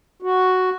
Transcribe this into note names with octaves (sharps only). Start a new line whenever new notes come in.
F#4